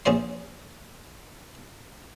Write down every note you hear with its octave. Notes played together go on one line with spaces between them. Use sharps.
A#1 C#4 G#4 C5 C6